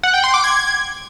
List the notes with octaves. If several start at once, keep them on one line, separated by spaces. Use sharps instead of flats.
F#5
G5
C6
D6
G#6